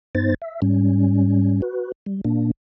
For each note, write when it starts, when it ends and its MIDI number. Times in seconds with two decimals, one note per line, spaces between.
0.15 0.34 43
0.15 0.34 59
0.15 0.34 63
0.15 0.34 72
0.15 0.34 93
0.42 0.60 76
0.62 1.61 44
0.62 1.61 55
0.62 1.61 61
1.62 1.92 66
1.62 1.92 71
2.06 2.21 55
2.24 2.51 46
2.24 2.51 58
2.24 2.51 62